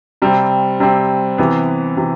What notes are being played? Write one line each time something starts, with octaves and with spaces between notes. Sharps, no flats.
C3 G3 C4
C3 G3 C4
C3 E3 B3
C3 E3